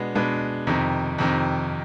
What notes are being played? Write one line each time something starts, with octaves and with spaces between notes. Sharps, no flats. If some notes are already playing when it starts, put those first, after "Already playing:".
Already playing: B2 G#3 B3 D4
B2 G#3 B3 D4
F2 C3 D#3
F2 C3 D#3